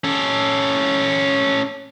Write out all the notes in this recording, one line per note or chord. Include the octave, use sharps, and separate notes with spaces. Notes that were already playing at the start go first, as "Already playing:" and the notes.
C#4 A4